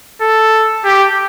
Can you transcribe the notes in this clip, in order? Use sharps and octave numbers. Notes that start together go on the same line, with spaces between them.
A4
G4